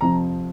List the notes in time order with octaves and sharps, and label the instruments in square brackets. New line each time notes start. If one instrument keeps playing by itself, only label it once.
[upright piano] F2 C3 F3 A#5